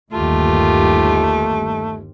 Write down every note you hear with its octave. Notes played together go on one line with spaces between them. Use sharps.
G1 D#2 A3 F4 G4